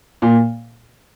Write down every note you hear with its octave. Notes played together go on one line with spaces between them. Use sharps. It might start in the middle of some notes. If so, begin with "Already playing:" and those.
A#2